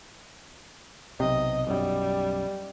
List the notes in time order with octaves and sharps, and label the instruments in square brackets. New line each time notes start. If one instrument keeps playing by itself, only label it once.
[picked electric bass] B1 C3 [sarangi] D#5
[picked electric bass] B1 F#2 [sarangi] G3